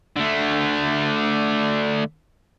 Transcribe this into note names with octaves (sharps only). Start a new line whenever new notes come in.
D3 A3